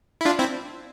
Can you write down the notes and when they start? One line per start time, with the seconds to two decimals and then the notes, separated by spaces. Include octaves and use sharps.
0.21 E4
0.25 D4 F4
0.39 C4 E4